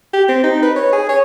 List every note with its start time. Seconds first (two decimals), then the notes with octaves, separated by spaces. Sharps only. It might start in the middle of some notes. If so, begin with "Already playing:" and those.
0.14 G4
0.29 C4
0.44 D#4
0.63 B4
0.76 C#5
0.93 G#4
1.09 C#5